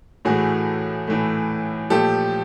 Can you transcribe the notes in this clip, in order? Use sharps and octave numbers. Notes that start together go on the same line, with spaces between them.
A2 E3 A3 F#4 G#4
A2 E3 A3
A#2 F3 A3 G4 A4